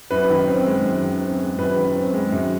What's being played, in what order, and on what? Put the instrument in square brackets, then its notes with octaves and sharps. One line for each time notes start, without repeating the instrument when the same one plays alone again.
[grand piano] F#2 B4
D#3
C4
G#3
F#2
D#3
C4
G#3
F#2 B4
D#3
C4
G#3
F#2